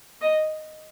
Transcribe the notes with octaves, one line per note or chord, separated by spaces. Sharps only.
D#5